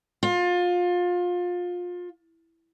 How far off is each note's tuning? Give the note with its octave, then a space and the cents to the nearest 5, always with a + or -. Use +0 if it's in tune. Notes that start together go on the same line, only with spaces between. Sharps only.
F4 +25